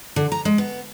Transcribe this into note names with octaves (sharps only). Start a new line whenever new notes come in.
D3
A#5
G#3
B3